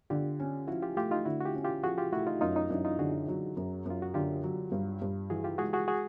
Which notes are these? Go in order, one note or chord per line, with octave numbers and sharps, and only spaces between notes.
D3 F4 G4
C#4
F3 E4 F#4
F4 G4
A3 F4 G4
D#4 F4
D3 E4 F#4
F#4
F4 G4
C#4
F4 G4
F3 F#4 G#4
F4 G4
A3 E4 F#4
D#4 F4
F#2 D#4 F4
C#4 D#4
F#2 D4 E4
D#4 F4
D3 F#4 G#4
F#3
F#2
F#2 F4
F#4
D3 F4 G4
F#3
G2
G2
E3 F#4 G#4
F4 G4
G#3 F#4 G#4
F#4 G#4
F#4 G#4